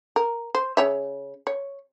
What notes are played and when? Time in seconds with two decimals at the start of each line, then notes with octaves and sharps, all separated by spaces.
0.16 A#4
0.55 C5
0.77 C#3 C#5 E5
1.47 C#5